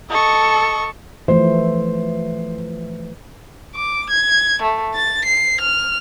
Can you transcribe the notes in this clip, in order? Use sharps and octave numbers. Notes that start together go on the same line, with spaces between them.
A4 D#5 C#6
E3 F3 A3 C5
D6
G#6
A3
A6
C7
F6